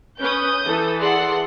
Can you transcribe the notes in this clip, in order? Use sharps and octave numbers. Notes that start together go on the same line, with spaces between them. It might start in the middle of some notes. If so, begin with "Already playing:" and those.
C#4 B4 D#6 G6
E3 A4
G#4 D5 F#5 C6